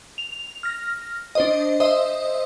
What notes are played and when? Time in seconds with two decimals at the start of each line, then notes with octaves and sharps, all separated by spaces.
0.18 F7
0.63 F6 A#6
1.35 D4 C5 D#5
1.80 C5 D#5 E5 D#6